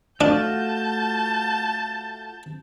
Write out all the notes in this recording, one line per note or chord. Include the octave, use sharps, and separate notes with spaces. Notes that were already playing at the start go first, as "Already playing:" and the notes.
A3 D4 F4 F#4 A5 G6